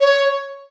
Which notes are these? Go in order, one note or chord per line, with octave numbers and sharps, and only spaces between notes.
C#5